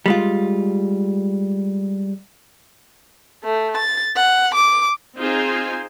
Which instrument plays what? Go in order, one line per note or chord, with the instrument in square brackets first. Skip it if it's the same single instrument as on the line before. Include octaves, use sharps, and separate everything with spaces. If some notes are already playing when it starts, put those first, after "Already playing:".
[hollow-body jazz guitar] G3 G#3 F4
[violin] A3
A6
F#5
D6
[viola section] C4 D#4 F4 G#4 C5 G#5